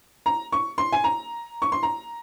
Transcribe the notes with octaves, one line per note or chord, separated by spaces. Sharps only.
A#5
C#6
C6
G#5
A#5
C#6
C6
A#5